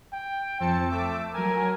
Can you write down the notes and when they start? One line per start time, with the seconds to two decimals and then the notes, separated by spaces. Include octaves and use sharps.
0.13 G5
0.60 F2 C4 A5 C#7
0.91 A3 D6 E6
1.34 F#3 A#4 G#5